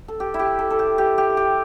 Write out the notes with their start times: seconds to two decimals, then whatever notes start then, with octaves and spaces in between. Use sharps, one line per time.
0.08 A4
0.20 G4
0.34 E4
0.39 G4
0.59 A4
0.70 A4
0.79 G4
0.98 G4
1.18 G4
1.37 G4